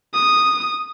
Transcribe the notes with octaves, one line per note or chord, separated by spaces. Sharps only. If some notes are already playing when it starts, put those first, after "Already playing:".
D#6